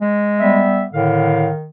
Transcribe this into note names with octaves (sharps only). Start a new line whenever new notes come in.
G#3
G3 B3 E5
A2 D3 D#3 F5